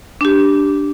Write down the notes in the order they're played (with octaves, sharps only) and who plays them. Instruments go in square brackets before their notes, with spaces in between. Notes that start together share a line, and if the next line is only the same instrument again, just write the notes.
[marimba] D4 G4